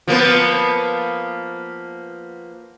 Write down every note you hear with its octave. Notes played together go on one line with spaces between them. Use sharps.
F3 A#3 B3